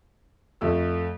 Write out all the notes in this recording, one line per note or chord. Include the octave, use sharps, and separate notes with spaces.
F2 A3 E5 E6